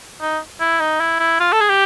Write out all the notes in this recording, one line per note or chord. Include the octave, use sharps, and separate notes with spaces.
D#4
E4
D#4
E4
E4
F4
A4
G#4
G4